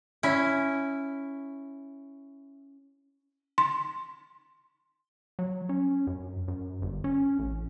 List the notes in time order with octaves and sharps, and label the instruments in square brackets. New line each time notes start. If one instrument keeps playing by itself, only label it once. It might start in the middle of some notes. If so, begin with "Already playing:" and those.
[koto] C#4 E4
[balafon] C6
[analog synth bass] F#3
C#4
F#2
F#2
G1
C#4
A1